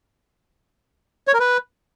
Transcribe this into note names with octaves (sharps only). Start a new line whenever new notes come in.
C#5
A#4
B4